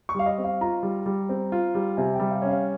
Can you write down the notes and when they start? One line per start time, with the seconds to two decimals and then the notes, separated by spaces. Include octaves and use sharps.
0.09 C#6
0.15 G3 F5
0.26 D#5
0.38 C4
0.44 F5
0.61 F4 A#5
0.83 G3
1.06 G3
1.29 C4
1.52 F4
1.75 G3
1.96 C3 G#5
2.14 G5
2.20 G3
2.31 F5
2.42 C#4
2.48 F5